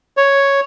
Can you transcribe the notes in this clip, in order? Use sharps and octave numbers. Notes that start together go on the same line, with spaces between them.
C#5